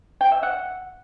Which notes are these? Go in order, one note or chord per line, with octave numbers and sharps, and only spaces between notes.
G5
E5
F#5